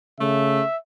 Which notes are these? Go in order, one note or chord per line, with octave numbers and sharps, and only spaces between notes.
C#3 A3 E5